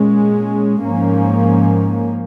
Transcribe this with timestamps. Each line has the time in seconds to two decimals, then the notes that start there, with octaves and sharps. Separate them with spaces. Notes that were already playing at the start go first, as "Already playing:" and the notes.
Already playing: A#2 G#3 C#4
0.83 G#2 F3 A#3 C#4